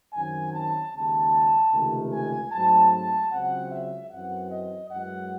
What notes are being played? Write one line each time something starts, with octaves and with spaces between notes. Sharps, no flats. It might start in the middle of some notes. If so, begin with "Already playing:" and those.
F#2 D#3 F#3 C4 G#5
A5
D#2 C#3 G#3 A5
C#2 C3 D#3 A3
G#5
G#2 F#3 A3 C4 A5
A5
C#2 C#3 F#3 C4 F#5
E5
F#2 E3 C4 F#5
D#5
F#2 E3 G#3 F#5